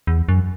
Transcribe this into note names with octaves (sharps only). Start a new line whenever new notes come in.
E2
F#2